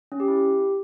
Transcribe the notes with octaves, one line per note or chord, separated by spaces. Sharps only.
C#4
G4
E4
G4